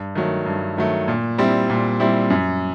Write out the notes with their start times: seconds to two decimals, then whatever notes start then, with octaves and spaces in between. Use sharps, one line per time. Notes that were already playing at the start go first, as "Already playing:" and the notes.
Already playing: G2
0.15 D#3 F#3 A3
0.46 G2
0.77 D#3 F#3 A3
1.08 A#2
1.38 G3 C4 E4
1.70 A#2
2.00 G3 C4 E4
2.30 F#2